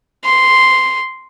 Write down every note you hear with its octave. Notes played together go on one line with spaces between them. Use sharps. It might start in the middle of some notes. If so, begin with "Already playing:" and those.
C6